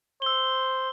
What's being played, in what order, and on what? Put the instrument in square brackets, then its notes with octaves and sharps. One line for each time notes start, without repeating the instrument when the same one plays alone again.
[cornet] C5 [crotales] E6 G7